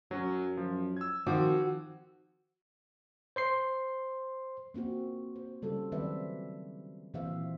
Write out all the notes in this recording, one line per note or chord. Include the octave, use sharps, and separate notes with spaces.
F#2 F#3 C#4
F3
E6 G#6
D#3 F3 C4 F#4 D6
C5 C6 C7
A#3 C4 F4 F#4
C5
C#3 G3 F4 A4
D#3 F#3 C4 B4 D5 E5
A#2 E3 C4 C5 E5 F5